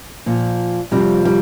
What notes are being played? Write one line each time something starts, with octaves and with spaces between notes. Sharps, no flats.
A#2 F3
F2 C3 F3 G3
G3